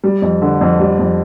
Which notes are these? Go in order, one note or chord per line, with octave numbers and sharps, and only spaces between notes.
G3
F2
D3
F2
G3
F2